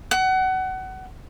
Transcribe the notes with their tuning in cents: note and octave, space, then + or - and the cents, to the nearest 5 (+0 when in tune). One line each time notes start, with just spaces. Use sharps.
F#5 +25